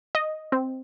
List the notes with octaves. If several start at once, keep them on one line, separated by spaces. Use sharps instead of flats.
D#5
C4